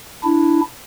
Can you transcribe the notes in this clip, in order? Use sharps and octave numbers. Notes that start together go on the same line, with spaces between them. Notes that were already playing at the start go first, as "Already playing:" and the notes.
D4 E4